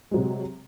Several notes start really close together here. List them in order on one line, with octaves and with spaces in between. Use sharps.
G#3 F#3 C3